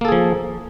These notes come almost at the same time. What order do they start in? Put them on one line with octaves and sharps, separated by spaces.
A#3 A4 G#4 F3